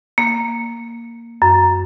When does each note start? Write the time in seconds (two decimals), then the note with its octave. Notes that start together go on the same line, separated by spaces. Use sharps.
0.18 A#3
1.42 F#2